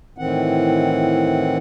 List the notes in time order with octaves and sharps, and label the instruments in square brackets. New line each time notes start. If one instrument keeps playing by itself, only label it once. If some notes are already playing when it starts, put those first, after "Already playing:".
[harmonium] A2 D#3 E3 C4 F#5